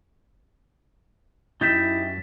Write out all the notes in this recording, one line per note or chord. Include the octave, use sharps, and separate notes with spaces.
F#2 D#4 E4 G4 E5 A6 B6 E7